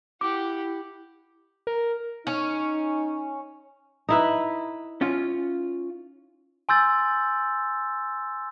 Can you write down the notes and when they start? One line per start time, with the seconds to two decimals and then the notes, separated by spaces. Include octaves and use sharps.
0.21 E4 G4 F#5 D6
1.67 A#4
2.27 C#4 D#4
4.09 D#4 E4 B4
5.01 C#4 F4
6.69 G#5 C6 E6 G6 A6